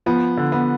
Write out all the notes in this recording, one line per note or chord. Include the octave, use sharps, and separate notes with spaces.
F3 B3
D3
B3